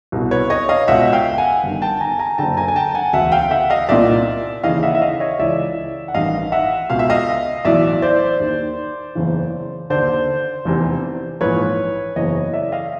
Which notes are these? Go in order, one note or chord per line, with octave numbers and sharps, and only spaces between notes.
C2 B2
B4 C#5
C#5 D#5
D#5 F5
C#2 B2 E5 F#5
F5 G5
F#5 G#5
G1 G2 D#3
G5 A5
G#5 A#5
G#5 A#5
F#1 F#2 D3 G5 A5
G#5 A#5
G#5
G5 A5
F#5 G#5
E1 D2 C#3 E5 F#5
F5 G5
G5
E5 F#5
D#5 F5
C2 A#2 D5 E5
D#2 C#3 E3 D#5 F5
E5 F#5
E5
D#5 F5
C#5 D#5
C#2 C#3 E3 D5 E5
F#5
A1 G2 D#3 D#5 F5
E5 F#5
C#2 B2 F5
E5
D#5 F5
B1 A2 E3 D5 E5
C5 D5
D#2 D#3
F#1 E2 C#3 E3
D#2 D3 C5 D5
F1 E2 C3
A#1 G#2 E3 B4 C#5
F#1 E2 C#3 E3 C#5 D#5
D5 E5
D#5 F5